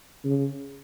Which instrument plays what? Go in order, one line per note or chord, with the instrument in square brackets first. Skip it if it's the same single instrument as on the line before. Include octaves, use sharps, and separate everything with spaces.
[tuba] C#3